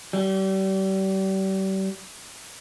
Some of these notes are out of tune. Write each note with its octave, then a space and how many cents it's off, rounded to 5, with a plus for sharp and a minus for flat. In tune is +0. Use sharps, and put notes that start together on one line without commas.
G3 -35